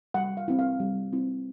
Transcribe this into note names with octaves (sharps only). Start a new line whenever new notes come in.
G3 F#5
F5
C4 E4
F5
G3
C4 E4